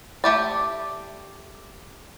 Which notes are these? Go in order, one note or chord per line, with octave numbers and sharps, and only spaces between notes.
A3 G4 D5